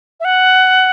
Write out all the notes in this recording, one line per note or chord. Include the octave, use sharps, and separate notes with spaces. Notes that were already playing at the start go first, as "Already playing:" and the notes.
E5
F#5